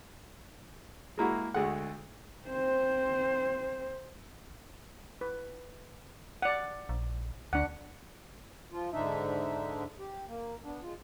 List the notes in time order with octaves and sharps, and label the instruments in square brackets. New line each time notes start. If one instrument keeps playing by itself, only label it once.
[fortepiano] G#3 A#3 E4 F#4
D2 G#3 A3 F#5
[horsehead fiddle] C4 C5
[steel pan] B4
D5 F#5
[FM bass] A#1
[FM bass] D2 [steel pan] D4 F#5
[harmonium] F3 F4
G#2 D3 D4 D#4 E5
G4
A#3
B3 D4
G#3 F4